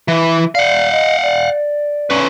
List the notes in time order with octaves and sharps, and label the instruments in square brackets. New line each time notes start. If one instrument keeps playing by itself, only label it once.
[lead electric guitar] E3
[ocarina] D5 [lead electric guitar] F5 F#5
[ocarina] D#5
D5
[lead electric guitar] C#4 B4